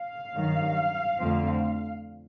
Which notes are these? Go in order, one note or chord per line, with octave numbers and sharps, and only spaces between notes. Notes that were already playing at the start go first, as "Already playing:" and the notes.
Already playing: F5
G2 D#3 F#3
F2 D3 F3 A3 C4